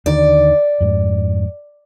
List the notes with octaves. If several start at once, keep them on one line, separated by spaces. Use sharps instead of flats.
D#2 D3 D#3 D5
F2 G#2